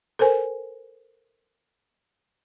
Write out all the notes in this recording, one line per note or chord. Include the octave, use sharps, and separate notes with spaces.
A4 A#4 C5 G#5